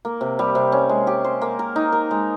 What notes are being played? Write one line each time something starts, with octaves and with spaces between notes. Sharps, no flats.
A#3
C3
G3
C3
C#4
G#3
G4
C5
A#3
A#4
D#4
A#4
G#3